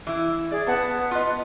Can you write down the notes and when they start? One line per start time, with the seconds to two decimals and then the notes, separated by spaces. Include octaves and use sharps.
0.07 E3 E4
0.51 G#4 D5
0.67 B3 F#5 A5
1.11 F4 D#5